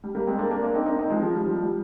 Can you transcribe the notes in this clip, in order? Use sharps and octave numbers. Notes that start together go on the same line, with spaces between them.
G3
G3 A#3
G#3 C4
A#3 D4
A#3 D4
A#3 D4
C4 D#4
C4 D#4
C4 D#4
F3 G#3
F3
G3
F3
G3